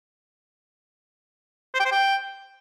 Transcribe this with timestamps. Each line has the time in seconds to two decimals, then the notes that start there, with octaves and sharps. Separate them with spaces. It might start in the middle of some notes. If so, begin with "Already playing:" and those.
1.74 C5
1.80 G5
1.86 C5
1.91 G5